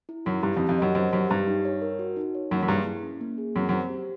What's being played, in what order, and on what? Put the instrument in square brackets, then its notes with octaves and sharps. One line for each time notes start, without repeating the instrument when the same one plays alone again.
[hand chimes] E4
[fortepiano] F#2 [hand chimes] E4
[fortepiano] G2 [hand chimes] G4
[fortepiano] F2
[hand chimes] G4
[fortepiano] F2
[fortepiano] F#2 [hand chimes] D#5
[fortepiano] F#2 [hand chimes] C5
[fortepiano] F#2 [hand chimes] G4
[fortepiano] G2 [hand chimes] G4
[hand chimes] D#4
C#5
A#4
F#4
D#4
C#5
[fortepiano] F#2 [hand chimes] A#3
[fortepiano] F#2
[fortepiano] G2 [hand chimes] G#4
[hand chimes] E4
C#4
A#3
G#4
[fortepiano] F#2 [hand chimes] C4
[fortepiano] F#2 [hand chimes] C5
[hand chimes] G4